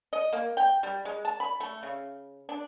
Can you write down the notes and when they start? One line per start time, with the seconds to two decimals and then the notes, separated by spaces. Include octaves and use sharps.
0.13 D#5
0.33 A#3
0.57 G5
0.83 G3
1.05 G#3
1.25 A5
1.40 B5
1.60 A3
1.83 C#3
2.49 D4